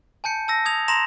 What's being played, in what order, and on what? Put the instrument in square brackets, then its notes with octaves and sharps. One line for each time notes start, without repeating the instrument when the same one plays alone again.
[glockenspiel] G#5 A5 G6 C#7
A5 E6 A#6
D#6 G#6 F7
A#5 C6 A#6 E7 F7